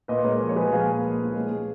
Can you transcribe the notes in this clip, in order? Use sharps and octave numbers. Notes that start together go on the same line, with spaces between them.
A#2 B4 D#5
G#3 A#4 C#5
F3
C#5
F3 G#4 B4
A#2 F5 G#5
A#2
A#2
G#3
G#3
G#3